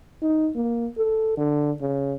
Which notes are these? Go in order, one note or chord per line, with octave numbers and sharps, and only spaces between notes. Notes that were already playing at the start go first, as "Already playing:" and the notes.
D#4
A#3
A4
D3
C#3